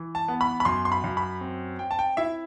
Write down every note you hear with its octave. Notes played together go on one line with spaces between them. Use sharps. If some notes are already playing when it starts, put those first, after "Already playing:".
Already playing: E3
A5
B3
B5
B5
F#2 C6
C6
B5
F#2
B5
C4
C4 G5
A5
G5
E4 E5